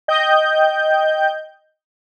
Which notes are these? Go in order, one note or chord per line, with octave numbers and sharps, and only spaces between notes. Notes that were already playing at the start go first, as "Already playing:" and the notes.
D#5 G5 G6